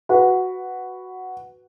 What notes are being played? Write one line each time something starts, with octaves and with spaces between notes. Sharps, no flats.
F#4 B4